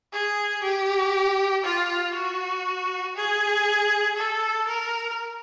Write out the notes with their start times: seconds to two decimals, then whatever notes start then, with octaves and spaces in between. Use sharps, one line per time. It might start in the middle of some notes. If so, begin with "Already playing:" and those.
0.13 G#4
0.64 G4
1.64 F4
2.15 F#4
3.16 G#4
4.17 A4
4.68 A#4